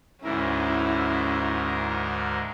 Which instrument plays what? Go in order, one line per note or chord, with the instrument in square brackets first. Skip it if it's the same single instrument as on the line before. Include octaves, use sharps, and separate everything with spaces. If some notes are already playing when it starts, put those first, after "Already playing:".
[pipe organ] D2 G#2 A#4 [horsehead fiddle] C#4 E4